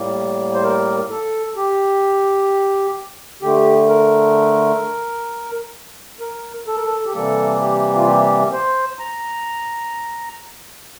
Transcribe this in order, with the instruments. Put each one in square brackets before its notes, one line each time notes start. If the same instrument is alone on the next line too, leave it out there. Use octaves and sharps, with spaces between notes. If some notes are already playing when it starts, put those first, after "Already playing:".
Already playing: [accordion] A2 G3 A#3
C5
A#4
A4
G4
D3 A3 G4
A#4
A#4
A4
A#4
A4
G4
C3 E3 G3 A#3 A4
G4
F4
G4
C5
A#5